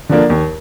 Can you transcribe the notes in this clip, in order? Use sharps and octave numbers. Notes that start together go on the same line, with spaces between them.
D3 F3 A#3 D4
D#2